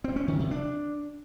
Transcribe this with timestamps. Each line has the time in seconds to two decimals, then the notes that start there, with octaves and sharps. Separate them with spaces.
0.04 C4
0.16 C#4
0.28 D#3
0.39 C3
0.51 D4